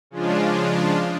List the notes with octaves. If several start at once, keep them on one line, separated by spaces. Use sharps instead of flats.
C#3 F3 G#3 D4 F4